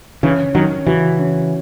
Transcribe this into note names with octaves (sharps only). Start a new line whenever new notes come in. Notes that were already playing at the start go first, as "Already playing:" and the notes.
C#3 E3 C#4
D#3 F#3 C#4
C#3 E3 F#4
C#4